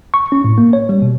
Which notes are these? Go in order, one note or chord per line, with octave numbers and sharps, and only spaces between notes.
C#6
C#4
A2
A#3
C#5
G3
B2